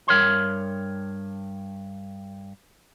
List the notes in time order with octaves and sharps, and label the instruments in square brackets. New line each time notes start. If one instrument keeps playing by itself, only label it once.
[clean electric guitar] G2 A#4 C#5 C6